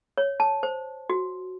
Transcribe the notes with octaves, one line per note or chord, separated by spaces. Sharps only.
C#5
A5
C5
F#4